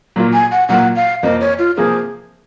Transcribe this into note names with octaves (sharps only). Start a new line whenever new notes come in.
A#2 F#3 A#3 F4
G#5
F#5
A#2 F#3 A#3 F4 F#5
F5
F2 C3 F3 A#3 D#5
C#5
F4
C3 F3 A#3 G#4